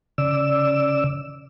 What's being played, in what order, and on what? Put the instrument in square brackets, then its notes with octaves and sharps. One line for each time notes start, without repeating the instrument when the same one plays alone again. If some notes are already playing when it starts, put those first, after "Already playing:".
[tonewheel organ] C#3 D5 E6